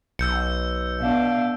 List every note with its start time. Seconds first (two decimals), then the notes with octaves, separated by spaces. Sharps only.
0.19 B1 E6 G6 C#7
1.00 B2 D4 E5 F5